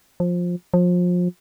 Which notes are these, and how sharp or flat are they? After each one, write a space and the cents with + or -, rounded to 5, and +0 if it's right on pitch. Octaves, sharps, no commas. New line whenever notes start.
F3 +15
F3 +30